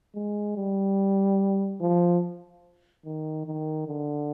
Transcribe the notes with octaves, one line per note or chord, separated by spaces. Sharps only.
G#3
G3
F3
D#3
D#3
D3